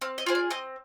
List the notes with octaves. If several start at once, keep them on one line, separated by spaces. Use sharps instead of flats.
C4 F5
D#5
F4 G#4 C5
D5
C4 D#5